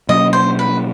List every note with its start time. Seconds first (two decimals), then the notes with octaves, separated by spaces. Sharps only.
0.09 B2 F#3 A#3 C#4 D#5
0.33 C5
0.59 B4